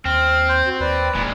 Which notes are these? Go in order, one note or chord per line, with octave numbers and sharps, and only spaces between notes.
D#2 C4 F6
C5
F#4
D#2 B4 D5
E1 A#2 G#3